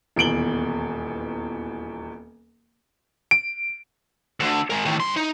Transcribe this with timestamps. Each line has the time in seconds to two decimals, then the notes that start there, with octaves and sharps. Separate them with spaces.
0.16 D#1 E2 B2 D7 F#7 G7
3.31 D7
4.40 D2 D3
4.70 G#3 A#4
4.85 A2 D#3
5.00 G2 C6
5.16 D#4